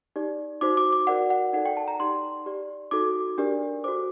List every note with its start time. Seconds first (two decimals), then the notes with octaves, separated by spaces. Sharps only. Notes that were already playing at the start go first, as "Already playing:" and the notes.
0.16 D#4 G4 D5
0.61 D#4 F#4 C5 D6
0.77 D6
0.92 D6
1.07 F#4 A#4 D5 F#5
1.30 F#5
1.53 D#4 A4 D5 F#5
1.66 G5
1.77 A5
1.88 A#5
2.00 D#4 G4 D5 C6
2.46 G4 D5
2.91 D#4 F#4 A4 D6
3.38 D4 G4 A#4 D5
3.84 F#4 A4 C5 D6